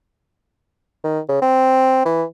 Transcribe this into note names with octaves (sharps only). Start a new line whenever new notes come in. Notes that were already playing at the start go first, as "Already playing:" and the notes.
D#3
C#3
C4
E3